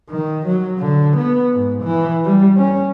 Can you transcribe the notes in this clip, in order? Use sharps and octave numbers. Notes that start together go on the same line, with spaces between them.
D#3
F#3
D3
B3
G#2
E3
G3
C#4